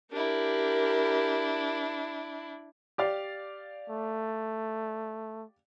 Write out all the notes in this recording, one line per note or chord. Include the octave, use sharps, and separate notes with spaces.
D4 E4 G4 A#4
G4 D5 F5
A3